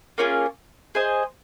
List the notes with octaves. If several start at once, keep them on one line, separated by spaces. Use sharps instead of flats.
A#3 C#4 F4 G#4
G#4 C5 D#5